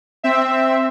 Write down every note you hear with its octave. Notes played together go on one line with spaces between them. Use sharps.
C4 E5